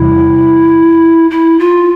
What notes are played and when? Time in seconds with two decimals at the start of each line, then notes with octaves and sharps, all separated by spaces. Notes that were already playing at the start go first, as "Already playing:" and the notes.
Already playing: E2 C3 E3 G3 E4
1.31 E4
1.59 F4